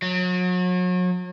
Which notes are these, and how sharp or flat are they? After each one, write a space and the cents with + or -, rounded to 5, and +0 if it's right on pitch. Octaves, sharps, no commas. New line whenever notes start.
F#3 -35